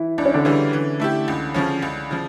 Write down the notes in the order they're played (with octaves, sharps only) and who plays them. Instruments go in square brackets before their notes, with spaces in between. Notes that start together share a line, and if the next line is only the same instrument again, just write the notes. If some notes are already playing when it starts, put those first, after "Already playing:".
Already playing: [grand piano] E3 E4
[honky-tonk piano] C#2 [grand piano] D4
[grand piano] C#4
D3 D4
[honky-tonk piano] C#3 E3 G3
E3
A3 E4 G4
C#2
C#3 F3 C#4
C#2
C#3 F3